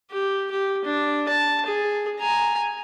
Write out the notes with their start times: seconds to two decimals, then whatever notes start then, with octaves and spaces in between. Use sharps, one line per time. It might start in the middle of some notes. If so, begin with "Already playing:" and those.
0.11 G4
0.51 G4
0.85 D4
1.28 A5
1.66 G#4
2.20 G#5 A#5